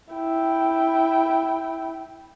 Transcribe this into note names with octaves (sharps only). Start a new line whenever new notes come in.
E4 G5